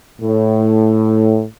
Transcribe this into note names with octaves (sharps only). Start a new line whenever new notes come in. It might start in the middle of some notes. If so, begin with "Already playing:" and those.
A2